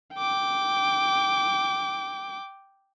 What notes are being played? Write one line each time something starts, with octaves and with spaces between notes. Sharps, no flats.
G5 D6